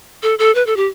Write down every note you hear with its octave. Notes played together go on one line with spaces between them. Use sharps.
A4
A4
B4
A4
G4